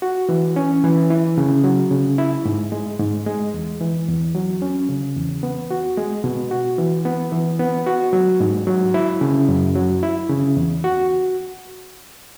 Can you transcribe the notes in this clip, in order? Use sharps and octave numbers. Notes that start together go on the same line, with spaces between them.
F#4
E3
C#4
E3
E4
C#3
F#3
C#3
E4
G#2
G#3
G#2
G#3
E2
E3
E2
F#3
C#4
C#3
E2
B3
F#4
G#3
B2
F#4
E3
B3
E3
B3
F#4
F#3
G#2
F#3
E4
C#3
F#2
F#3
E4
C#3
E2
F#4